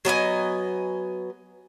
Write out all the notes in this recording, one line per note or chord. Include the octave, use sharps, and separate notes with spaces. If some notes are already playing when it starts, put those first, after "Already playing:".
F#3 B3 D#5 G#5